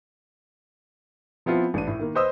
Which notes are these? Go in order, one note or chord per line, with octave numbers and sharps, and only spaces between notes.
F3 B3 C4 E4 F4
A1 D4 D#7
A2
D#3 A#3
B4 C5 D#5 D#6 E6